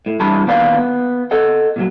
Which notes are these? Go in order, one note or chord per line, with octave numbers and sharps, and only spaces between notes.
A2
G2 E3 A5 B5
D#3 A#3 B3 D5 F5
B3
A4 D#5 F#5
A#2 E3 F#3